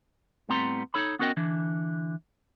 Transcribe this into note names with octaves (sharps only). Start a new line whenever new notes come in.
A2 G3 B3 C4 A#5 C6
D#4 A4 C#5 B5
B3 C#4 F#4 A#4 D#5 G5
D3 E3 D4